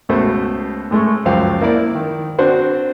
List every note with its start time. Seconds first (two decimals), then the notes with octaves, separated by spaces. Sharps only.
0.09 C#2 B2 A3 C5
0.91 A2 G#3 A3 C#6
1.25 C#2 F#2 F3 C5 F5 G5
1.62 A#3 E4 D5
1.95 D#3
2.39 C4 D4 F#4 C5